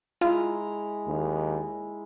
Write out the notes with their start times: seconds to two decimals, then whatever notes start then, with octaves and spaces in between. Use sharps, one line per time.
0.21 G#3 E4 F4 A#5
1.07 D#2